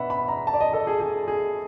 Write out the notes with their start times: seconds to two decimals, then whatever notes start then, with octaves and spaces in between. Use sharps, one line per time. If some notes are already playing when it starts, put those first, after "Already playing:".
Already playing: B2 B3 D4 E5 F#5 B5
0.10 B5
0.28 A#5
0.47 A5
0.54 D5
0.61 D#5
0.73 A4
0.87 G#4
1.00 G#4
1.28 G#4